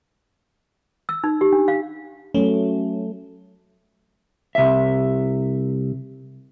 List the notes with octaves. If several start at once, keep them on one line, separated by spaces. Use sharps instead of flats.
E6
D#4
G4
D4
F5
F#3 A3 C#4
C2 E5